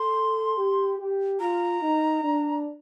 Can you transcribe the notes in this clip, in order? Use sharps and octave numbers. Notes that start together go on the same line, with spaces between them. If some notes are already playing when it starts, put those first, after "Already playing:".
Already playing: A4 C6
G4
G4
F4 A#5
D#4
D4